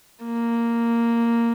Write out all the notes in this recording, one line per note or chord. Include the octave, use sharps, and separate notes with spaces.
A#3